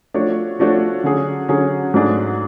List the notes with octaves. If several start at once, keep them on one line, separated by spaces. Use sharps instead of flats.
F3 A3 D4 F#4 C#5
F3 A3 D4 F#4 C#5
D3 F#3 C#4 G#4
D3 F#3 C#4 G#4
G#2 F#3 A3 D4 G#4